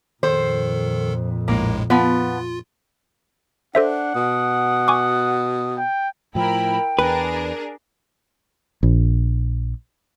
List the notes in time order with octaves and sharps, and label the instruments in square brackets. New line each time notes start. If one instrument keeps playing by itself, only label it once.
[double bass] F2 A#2 [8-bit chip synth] D#3 A4 [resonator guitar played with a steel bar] C5
[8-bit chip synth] A#1 A2 G#3 [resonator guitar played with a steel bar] A#3
[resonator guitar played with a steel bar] F3 B3 [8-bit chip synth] F4
[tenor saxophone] D4 [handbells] A4 C5 E5 [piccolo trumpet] F#5
[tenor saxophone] B2 [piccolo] D#6
[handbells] G#5 C#6 D6
[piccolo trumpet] G5
[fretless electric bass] A2 F3 [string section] E4 A#4 B5 [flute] G5
[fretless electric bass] E2 [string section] D4 G#4 A#4 [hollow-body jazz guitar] B4
[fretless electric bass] A#1